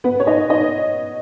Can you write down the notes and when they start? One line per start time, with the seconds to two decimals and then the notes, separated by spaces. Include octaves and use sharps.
0.04 B3 B4
0.20 C#5
0.27 D#4 D#5
0.50 D#4 D#5